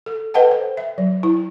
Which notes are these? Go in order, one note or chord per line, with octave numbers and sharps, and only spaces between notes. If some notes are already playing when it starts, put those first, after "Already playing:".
A4
A4 B4 D#5 F#5 G5 A5
C5
E5
F#3
E4